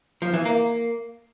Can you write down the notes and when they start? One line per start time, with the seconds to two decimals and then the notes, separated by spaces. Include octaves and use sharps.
0.22 F3
0.34 E3
0.45 A#3